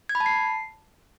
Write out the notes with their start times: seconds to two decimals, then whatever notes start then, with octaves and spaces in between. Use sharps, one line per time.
0.09 G#6
0.15 B5
0.20 A5
0.26 C7